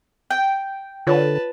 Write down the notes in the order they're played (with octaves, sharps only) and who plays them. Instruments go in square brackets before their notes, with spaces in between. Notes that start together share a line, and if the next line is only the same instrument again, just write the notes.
[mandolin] G5
[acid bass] D3 [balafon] F4 C#5 [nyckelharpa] B4 A5